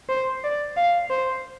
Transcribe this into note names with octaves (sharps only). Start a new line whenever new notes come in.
C5
D5
F5
C5